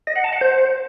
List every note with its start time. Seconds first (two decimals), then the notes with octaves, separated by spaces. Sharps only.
0.07 D#5
0.16 F#5
0.24 A5
0.33 F#5
0.41 C5